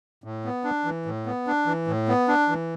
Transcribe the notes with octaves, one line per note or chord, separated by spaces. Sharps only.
A2
B3
D4
E3
A2
B3
D4
E3
A2
B3
D4
E3